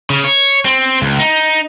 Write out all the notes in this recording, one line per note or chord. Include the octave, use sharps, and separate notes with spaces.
C#3
C#5
C4
C#2
D#4